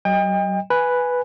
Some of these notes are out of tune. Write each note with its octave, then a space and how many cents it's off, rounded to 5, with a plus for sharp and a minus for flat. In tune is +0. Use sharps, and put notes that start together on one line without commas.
F#3 +40 D#5 +10 G5 +35
B4 +0 G#5 +0